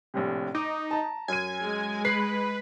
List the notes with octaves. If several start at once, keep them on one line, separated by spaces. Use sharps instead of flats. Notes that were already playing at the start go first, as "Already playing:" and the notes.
A#1 A2 C3
D#4 D6
A5 A#5
F#2 G#5 D#7
G#3
B4 C7